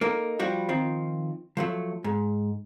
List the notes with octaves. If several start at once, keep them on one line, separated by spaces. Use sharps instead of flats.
A#3 D#4 A4
F3 G3 F#4
D#3 F3 C4
F3 F#3 A3
G#2